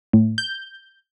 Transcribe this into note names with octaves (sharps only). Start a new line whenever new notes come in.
A2
G6